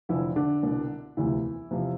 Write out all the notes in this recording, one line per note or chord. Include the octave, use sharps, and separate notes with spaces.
F1 F2 D3 E3 F3 E4
D3 D4
C2 B2
E1 D2 C3 E3 F3 E4
E2 C3 F3